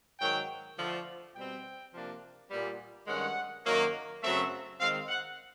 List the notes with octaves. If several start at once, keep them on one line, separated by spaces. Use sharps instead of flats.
G#2 D#3 F#3 G5
D3 F3 A3
B2 G3 C4 G5
C3 F3 A#3 D4
A#2 G3 B3
G2 D#3 G#3 C#4 F#5
F#2 D#3 F#3 A#3
F#2 C#3 F#3 A3 C4 E5
D#3 G#3 C4 F5
F#5